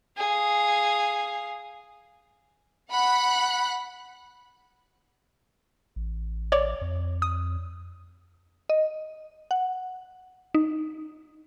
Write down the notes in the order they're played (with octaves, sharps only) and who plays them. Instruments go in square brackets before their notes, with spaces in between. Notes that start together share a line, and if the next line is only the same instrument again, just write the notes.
[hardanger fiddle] G#4 F5
[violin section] F#5 B5 F#6
[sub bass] A1
[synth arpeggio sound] C#5 D5
[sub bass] F2
[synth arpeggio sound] D#6
[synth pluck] D#5
F#5
D#4